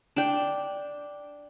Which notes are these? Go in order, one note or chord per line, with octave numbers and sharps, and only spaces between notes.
D4 G5